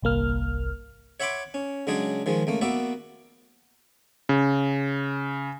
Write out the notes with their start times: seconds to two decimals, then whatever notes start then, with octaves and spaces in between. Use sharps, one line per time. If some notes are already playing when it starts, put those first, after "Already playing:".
0.02 G1 C2 A#3 F6
1.20 C#5 E5 F#5 B5 C6 D6
1.54 C#4
1.87 C#3 F#3 G#3 D4 G#4
2.26 D#3 F3 G#3
2.47 C#2 A3 A#3
2.61 A#3 B3 F#4 D5 E5
4.29 C#3